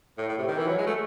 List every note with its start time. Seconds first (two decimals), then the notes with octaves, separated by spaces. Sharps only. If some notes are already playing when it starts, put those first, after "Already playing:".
0.18 A2
0.28 A2
0.38 C3
0.48 D#3
0.57 E3
0.67 F#3
0.78 G#3
0.87 A3